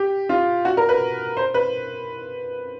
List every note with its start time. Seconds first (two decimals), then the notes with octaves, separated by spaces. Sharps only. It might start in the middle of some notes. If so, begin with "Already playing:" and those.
Already playing: G4
0.29 F4
0.65 F#4
0.77 A#4
0.89 B4
1.37 C5
1.54 B4